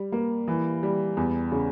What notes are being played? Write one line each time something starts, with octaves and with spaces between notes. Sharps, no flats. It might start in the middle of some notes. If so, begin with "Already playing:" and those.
Already playing: G3
A#3
E3
G3
E2
C#3